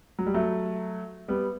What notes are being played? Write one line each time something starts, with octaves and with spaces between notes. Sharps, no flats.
F#3
G3
F#3 A3
G3 B3